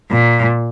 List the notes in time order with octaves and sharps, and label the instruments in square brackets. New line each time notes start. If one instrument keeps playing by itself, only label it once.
[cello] A#2